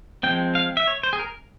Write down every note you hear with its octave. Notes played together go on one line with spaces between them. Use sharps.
F3 G#3 C4 G5
F5
E5
C#5
C5
G#4
A#4